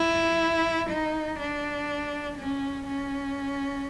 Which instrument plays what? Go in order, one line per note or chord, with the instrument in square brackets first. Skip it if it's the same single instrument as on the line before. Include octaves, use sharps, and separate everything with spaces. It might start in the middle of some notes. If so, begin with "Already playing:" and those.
Already playing: [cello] E4
D#4
D4
C#4
C#4